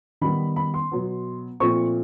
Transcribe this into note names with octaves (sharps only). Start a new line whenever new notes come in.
D#3 G3 B3 B5
B5
C6
B2 F#3 B3
A#2 F3 A3 C4 C#6